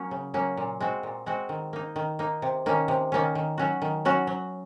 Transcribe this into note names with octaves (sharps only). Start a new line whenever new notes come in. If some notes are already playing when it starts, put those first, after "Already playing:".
Already playing: F#3 A#3 C#4
C#3
F#3 A#3 C#4
A#2
G#3 C4 F#4
A#2
G#3 C4 F#4
D#3
A#3 D#4
D#3
A#3 D#4
C3
D#3 A#3 C#4
C3
D#3 A#3 C#4
D#3
F#3 C#4 F#4
D#3
F#3 C#4 F#4
F#3